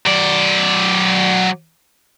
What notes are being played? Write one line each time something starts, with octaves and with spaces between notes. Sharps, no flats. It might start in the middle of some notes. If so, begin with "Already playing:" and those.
F#3 D5